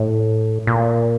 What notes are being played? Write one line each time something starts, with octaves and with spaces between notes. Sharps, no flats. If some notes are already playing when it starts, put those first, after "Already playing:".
Already playing: A2
A#2